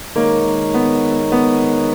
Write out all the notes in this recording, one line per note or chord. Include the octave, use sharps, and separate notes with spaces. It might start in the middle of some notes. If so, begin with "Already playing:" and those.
D#3 G#3 A#3 D#4 A#4 C#5
B3
B3